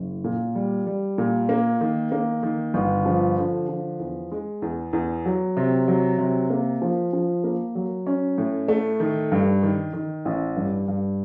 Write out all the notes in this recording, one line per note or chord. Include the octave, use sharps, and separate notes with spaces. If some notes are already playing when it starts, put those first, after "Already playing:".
Already playing: F#1
A#2
G3
G3
A#2
A#3
D#3
A#3
D#3
G1
F3
D3
F3
E2
G#3
E2
E2
F#3
C3
F#3
C3
A#3
F3
F3
A#3
F#3
C#4
A2
A3
D#3
G2
D#3
D#3
A1
G2
G2